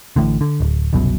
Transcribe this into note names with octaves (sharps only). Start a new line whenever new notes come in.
A1 A2 D3
D3
D1
F#1 C2 F#2 B2